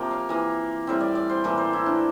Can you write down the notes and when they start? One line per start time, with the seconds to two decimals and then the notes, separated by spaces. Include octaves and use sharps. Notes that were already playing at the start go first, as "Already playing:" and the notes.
Already playing: C3 F3 A#3 G5 A5
0.11 F5
0.29 E3 A#3
0.87 A2 G3 C4 E5
1.01 D5
1.15 D5
1.30 C5
1.44 A2 E3 A#3 A4
1.58 C5
1.73 E4
1.86 D4